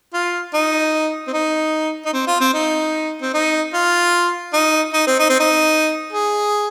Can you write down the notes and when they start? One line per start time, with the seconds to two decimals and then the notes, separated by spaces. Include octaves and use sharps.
0.14 F4
0.54 D#4
1.28 C4
1.33 D#4
2.05 D#4
2.14 C4
2.27 F4
2.40 C4
2.54 D#4
3.22 C4
3.34 D#4
3.74 F4
4.54 D#4
4.93 D#4
5.07 C4
5.20 D#4
5.30 C4
5.40 D#4
6.13 G#4